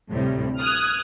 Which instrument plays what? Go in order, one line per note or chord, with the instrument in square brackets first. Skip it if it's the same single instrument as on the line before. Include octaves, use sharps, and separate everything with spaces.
[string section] D2 A2 C3 G3
D#6 F6 F#6 G#6